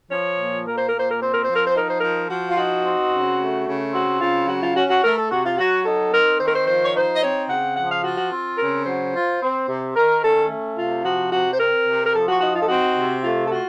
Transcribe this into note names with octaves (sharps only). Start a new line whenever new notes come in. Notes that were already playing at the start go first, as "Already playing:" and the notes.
F3 C#5
A#2
A#3 A#4
C5
A#2 A#4
C5
A#4
C4 C5
A#4
F3 C5
A#4
C5
D#4 A#4
C5
F3 A#4
F3 F#4
F4
D#4 F#4
C4
C#3
A3
C#3
C4 F#4
C#3 F4
F#3 F#4
F4
C#4 F#4
F#4
A3 A#4
A4
C3 F#4
F4
F#3 F#4
D#4 A4
C4 A#4
D#3 C5
A#4
C5
F3 C5
C#5
D#4 C5
D#5
C4 C#5
C#3 F#5
F3 F#5
F5
F4 F#4
F#4
C4
C#3 A#4
F#3 C5
F4
C4
C3
D#3 A#4
C#4 A4
A3
C3 F4
F3 F#4
C3 F#4
C5
C4 A#4
C3
A#4
F3 A4
F#4
D#4 F#4
F4
A4
C4 F#4
C3
A3 F4
A4
F4 F#4